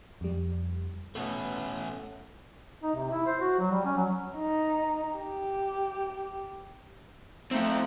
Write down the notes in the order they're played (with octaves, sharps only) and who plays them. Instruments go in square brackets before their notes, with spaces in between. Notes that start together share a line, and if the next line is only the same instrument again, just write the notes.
[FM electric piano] F2 G3
[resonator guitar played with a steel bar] B2 B3 [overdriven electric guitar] A3 C#4
[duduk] D#4
C3
E4
C5
F#4
F#3
G3
C#4
F#3
[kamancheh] D#4
G4
[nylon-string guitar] A3 D#4 G5 [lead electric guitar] C4 A4